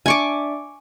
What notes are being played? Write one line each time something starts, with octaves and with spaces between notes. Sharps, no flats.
D4 D5 E5 G#5 C#6 D6